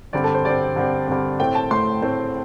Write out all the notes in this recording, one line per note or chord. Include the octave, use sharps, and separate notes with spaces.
G2 D3 C4 D5
A4
C5
G2 D3 C4 D5
G2 D3 C4
G2 D3 C4
A2 A3 C4 G5
A5
A2 A3 C4 C6
A2 A3 C4